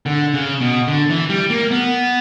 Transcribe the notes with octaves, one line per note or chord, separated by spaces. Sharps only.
D3
C#3
B2
D3
E3
G3
A#3
B3